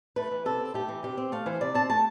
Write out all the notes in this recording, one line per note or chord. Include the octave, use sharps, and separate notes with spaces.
A3 B4
E3
C3 A4
C4
A3 G4
E3
C3 G4
C4
A3 F5
E3 C5
C3 D5
C4 A5
A3 A5